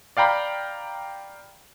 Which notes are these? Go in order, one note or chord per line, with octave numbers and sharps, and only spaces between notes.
D5 F5 G5 A#5 B5